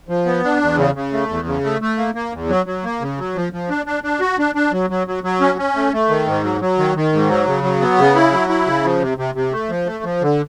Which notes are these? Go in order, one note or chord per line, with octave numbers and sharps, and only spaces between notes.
F3
B3
D4
E2
C#3
C#3
A3
E2
C#3
A3
A3
A#3
A#3
E2
F#3
F#3
A#3
C#3
F#3
F3
F3
D4
D4
D4
F#4
D4
D4
F#3
F#3
F#3
F#3
C#4
C#4
A3
A3
D#3
G#2
F#3
F#3
D#3
D#3
G#2
F#3
C#3
F#3
B3
C#3
E4
F#3
E4
C#3
F3
C3
C3
C3
A3
F3
A3
F3
D3